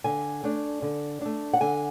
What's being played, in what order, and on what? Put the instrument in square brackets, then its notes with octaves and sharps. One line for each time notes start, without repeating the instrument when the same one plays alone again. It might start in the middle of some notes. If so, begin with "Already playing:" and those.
[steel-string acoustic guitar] D3 G#5
A3 D4
D3
A3 D4
F#5
D3 G#5